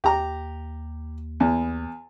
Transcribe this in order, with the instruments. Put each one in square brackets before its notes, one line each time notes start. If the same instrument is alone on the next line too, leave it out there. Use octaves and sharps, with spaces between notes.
[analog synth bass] D#2 [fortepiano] G4 A#5
[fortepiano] E2